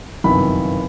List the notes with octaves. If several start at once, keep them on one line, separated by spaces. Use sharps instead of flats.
G1 F#2 C3 D#3 E3 B5